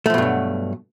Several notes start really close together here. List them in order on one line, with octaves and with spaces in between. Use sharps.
A3 F3 B2 G2 F#3